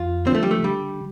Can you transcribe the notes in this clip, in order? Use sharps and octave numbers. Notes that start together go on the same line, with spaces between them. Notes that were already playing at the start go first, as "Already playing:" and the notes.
Already playing: F2 F4
D3 F3 C4
A3
G3
A3
D3 G3